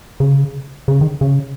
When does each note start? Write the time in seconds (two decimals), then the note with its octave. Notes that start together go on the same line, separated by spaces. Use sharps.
0.20 C#3
0.88 C#3
1.01 D#3
1.21 C#3